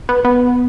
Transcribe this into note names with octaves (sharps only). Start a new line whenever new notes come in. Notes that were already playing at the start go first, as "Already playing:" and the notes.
B3
B3